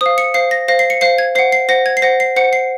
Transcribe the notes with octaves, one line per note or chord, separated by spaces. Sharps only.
C5 F5 D#6
C#7
C5 F5 C7
A#6
C5 F5 A#6
C7
C#7
C5 F5 C7
G#6
C5 F#5 C7
C7
C5 F#5 A#6
G#6
C7
C5 F#5 A#6
C7
C5 F#5 C#7
C7